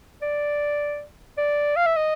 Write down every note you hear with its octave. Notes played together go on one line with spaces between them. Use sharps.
D5
D5
F5
E5
D#5